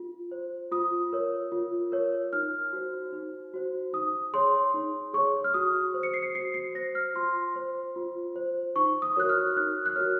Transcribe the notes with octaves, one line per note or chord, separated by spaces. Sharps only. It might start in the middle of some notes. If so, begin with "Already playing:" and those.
Already playing: F4
C5
F4 D#6
A#4 C#5
F4
A#4 C#5
D#4 F6
F#4 C5
D#4
F#4 C5
D#4 D#6
G#4 C#5 C6
D#4
G#4 C#5 C#6
F6
F#4 D#6
C5
C#7
C7
C#7
F#4 C7
C7
C5 A#6
F6
F4 C6
C5
F4
C5
D#4 C#6
D#6
F#4 A#4 C#5 F#6
F6
D#4 F#6
F#6
F#4 A#4 C#5 F6